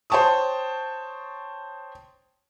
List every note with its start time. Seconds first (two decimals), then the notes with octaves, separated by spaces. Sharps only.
0.10 C5 C#5 G5 A5 C#6 D#6